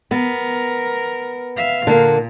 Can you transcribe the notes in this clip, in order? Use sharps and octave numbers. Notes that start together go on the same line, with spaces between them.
B3 A#4
E5 F5
A#2 D3 A#3